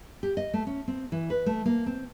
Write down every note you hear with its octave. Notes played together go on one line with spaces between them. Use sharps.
G4
D#5
A3
C#4
C4
E3
B4
A3
A#3
C4